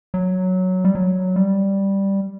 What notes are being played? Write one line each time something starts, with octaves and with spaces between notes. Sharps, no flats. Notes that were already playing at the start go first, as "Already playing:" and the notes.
F#3
G3
F#3
G3